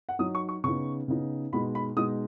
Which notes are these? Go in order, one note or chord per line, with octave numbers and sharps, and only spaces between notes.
F#5
F#3 D#4 D#6
C#6
C#6
C#3 B3 D#4 C#6
C#3 B3 D#4
B2 G#3 D#4 B5
B5
B2 G#3 D#4 D#6